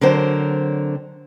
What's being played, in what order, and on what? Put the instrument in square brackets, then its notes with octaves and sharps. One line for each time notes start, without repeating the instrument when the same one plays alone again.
[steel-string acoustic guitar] D3 F#3 C4 A#4 C5 C#5